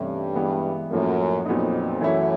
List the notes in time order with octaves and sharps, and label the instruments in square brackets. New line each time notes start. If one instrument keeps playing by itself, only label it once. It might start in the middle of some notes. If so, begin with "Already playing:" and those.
Already playing: [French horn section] G2 [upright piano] C3 E3 A3 C#4
[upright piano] E3 G#3 B3 E4
[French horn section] F#2 [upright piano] A2 F3 A#3
[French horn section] F2 [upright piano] A#2 F#3 B3 D#4
[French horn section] F#2 [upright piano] E3 A3 C#4 E4